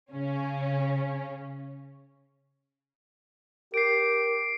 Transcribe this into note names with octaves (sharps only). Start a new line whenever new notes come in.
C#3 C#4
G4 A#4 C7 D7